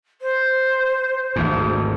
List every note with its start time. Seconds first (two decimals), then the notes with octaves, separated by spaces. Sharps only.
0.21 C5
1.36 G#1 D2 G#2